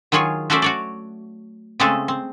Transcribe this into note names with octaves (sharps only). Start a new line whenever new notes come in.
D#3 F#3 F4 G#4 C#5
A3 C#4 F#4 C5 D5 E5
F#4 C#5 D5
C#3 G#3 A3 C4 G#4 A4
C4